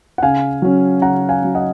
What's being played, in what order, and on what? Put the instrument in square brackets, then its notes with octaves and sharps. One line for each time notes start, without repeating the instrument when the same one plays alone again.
[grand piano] F#5
C#3 F5 G#5
F#3 C#4
C#3 F#5 A#5
F5 G#5
F#3 C#4
D#5 F#5